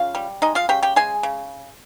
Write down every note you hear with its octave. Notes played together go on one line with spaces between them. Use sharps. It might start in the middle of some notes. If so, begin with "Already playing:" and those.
Already playing: C#3 F4 F5
G3
G#3 D#4 D#5
F4 F5
C#3 G4 G5
G4 G5
G#3 G#4 G#5
C#3